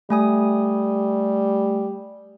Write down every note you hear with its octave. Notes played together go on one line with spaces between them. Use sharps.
G3 A3 G#5 D#6